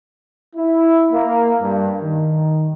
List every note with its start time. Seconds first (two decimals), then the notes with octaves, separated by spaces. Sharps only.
0.56 E4
1.12 A#3
1.61 G2
2.01 D#3